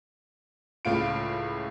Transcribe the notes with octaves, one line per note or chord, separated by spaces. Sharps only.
C#2 A2 F4 D7